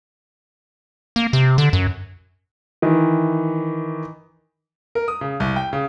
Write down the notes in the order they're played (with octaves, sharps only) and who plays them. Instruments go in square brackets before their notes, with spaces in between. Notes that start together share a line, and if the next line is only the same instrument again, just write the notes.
[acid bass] A#3
C3
D3
F#2
[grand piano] D#3 E3
A#4
D#6
C#3
C2
G5
C#3